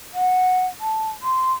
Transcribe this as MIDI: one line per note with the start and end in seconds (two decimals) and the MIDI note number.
0.14 0.67 78
0.81 1.09 81
1.22 1.53 84